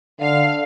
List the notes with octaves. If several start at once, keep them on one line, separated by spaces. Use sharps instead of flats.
D3 F5